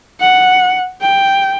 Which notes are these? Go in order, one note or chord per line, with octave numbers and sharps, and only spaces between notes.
F#5
G5